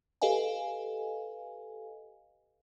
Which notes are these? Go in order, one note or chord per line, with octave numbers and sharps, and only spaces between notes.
G4 A4 B4 D#5 F5 G#5